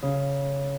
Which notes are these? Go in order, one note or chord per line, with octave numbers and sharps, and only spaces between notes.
C#3